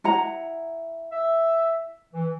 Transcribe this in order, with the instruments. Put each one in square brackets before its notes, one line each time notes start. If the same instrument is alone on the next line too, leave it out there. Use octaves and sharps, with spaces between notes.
[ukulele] E4 F#5 A#5
[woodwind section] E5
E3